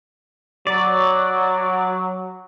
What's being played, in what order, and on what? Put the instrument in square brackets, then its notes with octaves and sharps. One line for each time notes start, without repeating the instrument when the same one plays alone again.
[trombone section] F#3 [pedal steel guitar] D5